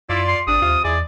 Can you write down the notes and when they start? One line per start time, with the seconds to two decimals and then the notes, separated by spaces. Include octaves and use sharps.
0.09 F#2 E4 F4 D5
0.28 C6
0.47 G#1 C3 G3 D4 D#6
0.62 D#2 C3 F4
0.84 E2 G#3 E4 G#4 D5